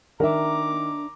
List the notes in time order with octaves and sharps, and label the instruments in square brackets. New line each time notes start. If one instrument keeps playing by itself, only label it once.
[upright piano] D#3 [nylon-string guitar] D4 E5 [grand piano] A#4 [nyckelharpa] A#5 D6